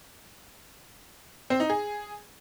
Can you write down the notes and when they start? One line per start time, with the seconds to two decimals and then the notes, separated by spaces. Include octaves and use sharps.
1.50 C4
1.60 D#4
1.70 G#4